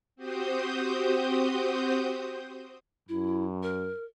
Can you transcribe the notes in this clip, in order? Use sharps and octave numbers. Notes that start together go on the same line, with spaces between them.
C4 F#4 G4 C5 D#6 G6
F#2 E4
A#4